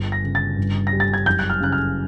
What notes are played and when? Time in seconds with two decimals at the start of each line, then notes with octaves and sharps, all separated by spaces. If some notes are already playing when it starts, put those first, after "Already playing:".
Already playing: G1
0.12 A#6
0.24 C#3
0.35 A6
0.58 G2
0.87 A#6
0.93 G3
1.00 A6
1.14 G#6
1.26 F#1 G6
1.39 F#6
1.50 F6
1.61 C#3 F#6
1.72 F6